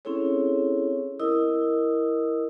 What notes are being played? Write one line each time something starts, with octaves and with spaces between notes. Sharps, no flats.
C4 C#4 E4 G#4 A4 C#5
E4 A#4 D#5 D#6 E6